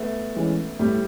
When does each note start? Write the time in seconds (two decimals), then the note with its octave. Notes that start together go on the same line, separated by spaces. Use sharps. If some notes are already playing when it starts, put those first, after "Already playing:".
Already playing: A3 B3
0.35 E3 G#3 C#4
0.79 A2 G3 A3